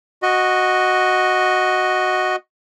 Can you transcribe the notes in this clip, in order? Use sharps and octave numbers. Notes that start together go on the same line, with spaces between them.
F#4 D#5